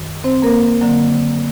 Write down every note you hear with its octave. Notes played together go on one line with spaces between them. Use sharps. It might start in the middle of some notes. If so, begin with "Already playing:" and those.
Already playing: F#2 D#3
C4 C5
A#3 A#4
D3 F#3 A#3